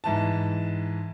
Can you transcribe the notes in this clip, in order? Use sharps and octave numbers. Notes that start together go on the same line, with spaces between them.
G#2 E3 A5